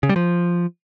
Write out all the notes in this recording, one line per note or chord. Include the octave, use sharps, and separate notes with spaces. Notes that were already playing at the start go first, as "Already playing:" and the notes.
C#3
G3
F3